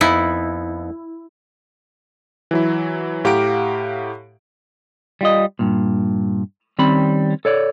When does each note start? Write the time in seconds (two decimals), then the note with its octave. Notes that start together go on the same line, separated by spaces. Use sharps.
0.01 F2 B3 D#4 E4
2.51 E3 F#3 E4
3.25 A2 G4 F5 F#5 A#5 D7
5.21 G3 F4 D#5
5.59 G2 A#2
6.79 D#3 G3 C4 C#4 B5
7.45 A4 C#5 D5